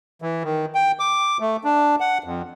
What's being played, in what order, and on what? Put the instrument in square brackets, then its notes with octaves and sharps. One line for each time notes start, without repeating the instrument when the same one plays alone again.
[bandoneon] E3
D#3
G5
D6
A3
D4
F#5
F2